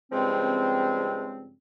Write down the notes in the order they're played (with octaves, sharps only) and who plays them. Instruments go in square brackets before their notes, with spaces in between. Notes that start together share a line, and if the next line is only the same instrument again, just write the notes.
[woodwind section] G2 C#3 F3 G#3 C4